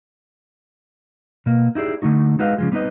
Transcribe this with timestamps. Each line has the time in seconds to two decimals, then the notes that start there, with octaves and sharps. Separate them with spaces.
1.46 B2 A#3
1.75 D#4 E4 G4 G#4 D5
2.02 D3 A3 D#4 F#4
2.39 G#3 D#4 F#4 B4 D#5 F5
2.58 C#3 F3 G#3
2.72 G3 B3 C4 D#4 B4 D#5